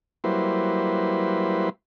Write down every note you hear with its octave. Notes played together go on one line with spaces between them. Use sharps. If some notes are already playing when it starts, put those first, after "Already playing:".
F#3 G3 A#3 E4 B4 C5